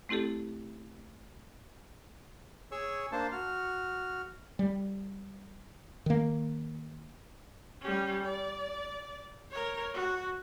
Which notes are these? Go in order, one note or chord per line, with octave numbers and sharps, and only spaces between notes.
A3 C4 E4 G4 A4
G#4 C#5 C#6 E6
A#3 D4 C5 A5
F#4 F6
G3
D#3 A#3
G3 C#4
D5
A#4 C#5
F#4